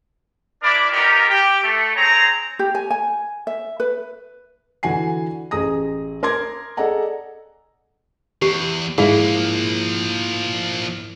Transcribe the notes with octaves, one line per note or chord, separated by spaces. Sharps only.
D4 E4 A#4 D5 B5 D6
B3 D#4 F4 G4 A#4
G4
A3
C4 G#4 C#5 A#5
G4
G#5
G#5
E5
B4
D3 E3 F#4 F#5 G#5 C7
A1 G#4 A#5 D#6 A#6
A#4 C6 D6 G#6 A#6
G#4 A4 D5 D#5 F#5 A#5
E2 G4
G#2 F3 A#3 E4 G#4 F5